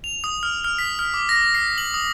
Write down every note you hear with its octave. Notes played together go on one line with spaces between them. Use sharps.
F7
D#6
F6
F6
B6
F6
D6
A#6
C7
F#7
D#6